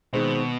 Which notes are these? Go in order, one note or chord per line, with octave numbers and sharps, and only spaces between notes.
B2 D#3 G#3 C4